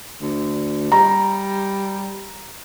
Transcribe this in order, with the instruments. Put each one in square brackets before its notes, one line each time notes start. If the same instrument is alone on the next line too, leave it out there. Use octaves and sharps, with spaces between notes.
[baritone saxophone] D2
[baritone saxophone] G3 [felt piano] A#5